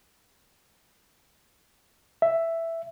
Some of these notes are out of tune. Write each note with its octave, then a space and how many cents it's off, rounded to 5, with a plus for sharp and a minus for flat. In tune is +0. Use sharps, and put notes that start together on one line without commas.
E5 +5